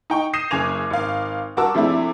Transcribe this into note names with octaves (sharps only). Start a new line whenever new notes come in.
D#4 G5 C#6
D#6 G6 A#6 C7 D#7 E7
F#1 C#3 G#5 D6 G#6 F7
G#1 F5
G2 F#4 A#4 A5 D6 E6
C3 F3 A3 D4 E4 G#4